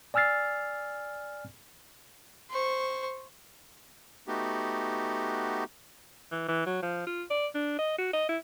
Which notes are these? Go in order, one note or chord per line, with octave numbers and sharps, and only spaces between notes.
D5 G#5 E6 F6 A6 C7
C5 C#6
A3 B3 D#4 F#4 G4
E3
E3
F#3
F3
F4
D5
D4
D#5
F#4
D#5
E4